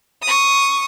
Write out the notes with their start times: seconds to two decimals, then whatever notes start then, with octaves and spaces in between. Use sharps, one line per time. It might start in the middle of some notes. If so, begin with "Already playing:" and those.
0.23 C#6 D#6